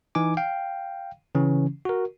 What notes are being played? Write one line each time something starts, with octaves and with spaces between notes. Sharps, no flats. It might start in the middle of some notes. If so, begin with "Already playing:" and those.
E3 D#4 G#5 D6
F5 G5
C#3 E3 C#4
F#4 A#4